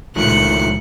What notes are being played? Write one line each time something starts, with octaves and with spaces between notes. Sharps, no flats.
C#2 A#2 D#3 F3 A3 F#6 C#7